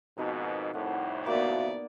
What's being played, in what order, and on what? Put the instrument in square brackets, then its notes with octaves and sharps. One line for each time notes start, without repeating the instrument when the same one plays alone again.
[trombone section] F2 G#2 B2 [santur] D#4 A#4
[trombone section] C2 F2 A2 [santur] F#5
[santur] A#3 [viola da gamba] B3 D5 [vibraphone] F#4 E5 F5